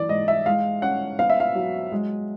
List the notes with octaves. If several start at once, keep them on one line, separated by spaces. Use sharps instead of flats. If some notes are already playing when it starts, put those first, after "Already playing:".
Already playing: E3 D5
G#2 D#5
E5
G#3 F5
C#4 F#5
B3 F5
E5
F5
F#3
G#3